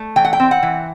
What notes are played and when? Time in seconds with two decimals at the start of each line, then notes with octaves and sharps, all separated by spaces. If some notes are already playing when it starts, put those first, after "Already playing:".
Already playing: A3
0.16 E3 G5
0.25 F#5
0.33 G5
0.40 C4
0.51 F#5
0.63 E3